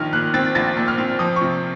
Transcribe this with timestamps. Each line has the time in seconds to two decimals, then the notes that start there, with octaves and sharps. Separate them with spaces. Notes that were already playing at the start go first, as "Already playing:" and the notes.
Already playing: A#1 D#3 F6
0.13 A#2 F#6
0.34 C4 A6
0.55 A#1 A6
0.77 A#2
0.88 F6
0.98 C4
1.19 F3 D#6
1.36 C#6
1.41 C3